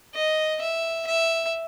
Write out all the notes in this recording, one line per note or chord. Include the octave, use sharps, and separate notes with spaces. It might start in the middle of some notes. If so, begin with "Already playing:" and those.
D#5
E5
E5